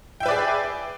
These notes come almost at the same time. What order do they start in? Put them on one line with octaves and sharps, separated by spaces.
G5 E5 B4 D5 G#4